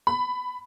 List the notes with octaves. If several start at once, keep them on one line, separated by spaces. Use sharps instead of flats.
B5